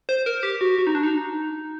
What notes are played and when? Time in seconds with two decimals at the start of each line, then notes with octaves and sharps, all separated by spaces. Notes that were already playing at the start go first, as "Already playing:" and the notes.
0.09 C5
0.26 A#4
0.43 G4
0.61 F#4
0.79 F#4
0.87 D#4
0.95 D4
1.03 D#4